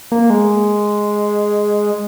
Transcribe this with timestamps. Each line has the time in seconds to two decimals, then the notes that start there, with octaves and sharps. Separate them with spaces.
0.12 A#3
0.30 G#3